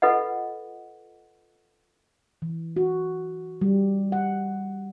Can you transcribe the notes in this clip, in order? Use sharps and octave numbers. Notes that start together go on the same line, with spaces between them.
F4 A4 B4 D#5 F#5
E3
F#4
G3
F#5